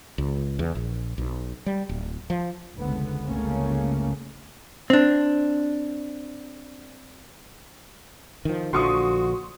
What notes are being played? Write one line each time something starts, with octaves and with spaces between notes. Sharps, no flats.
C#2
E2
A#1
B1
G3
D1
F3
F1 C#2 D3 B3
G1 C#2 C#3 A3 A#3 C#4
C4 D4
D#3 F3
A#1 D3 F3 F#4 C6 C#6 D#6